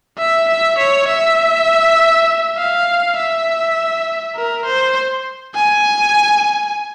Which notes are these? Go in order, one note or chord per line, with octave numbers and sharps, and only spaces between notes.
E5
E5
C#5
E5
F5
E5
A#4
C5
G#5